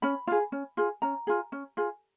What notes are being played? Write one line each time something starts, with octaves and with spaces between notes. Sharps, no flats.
C#4 B5
F4 G#4
C#4
F4 G#4
C#4 A#5
F4 G#4
C#4
F4 G#4